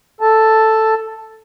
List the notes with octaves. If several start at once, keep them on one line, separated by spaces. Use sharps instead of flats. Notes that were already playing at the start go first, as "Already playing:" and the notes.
A4 A5